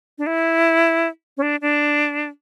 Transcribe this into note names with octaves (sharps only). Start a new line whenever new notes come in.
D4
E4
C#4
D4
D4